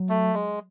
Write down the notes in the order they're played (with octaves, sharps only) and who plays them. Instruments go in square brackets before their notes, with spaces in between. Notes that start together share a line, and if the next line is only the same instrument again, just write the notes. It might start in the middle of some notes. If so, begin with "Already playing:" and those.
Already playing: [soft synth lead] F#3
[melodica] A3
G#3